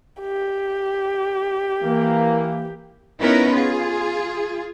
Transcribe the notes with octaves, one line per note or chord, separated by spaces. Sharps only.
G4
E3 A#3
B3 C#4 D#4 E4 A#4 B4
F4 G#4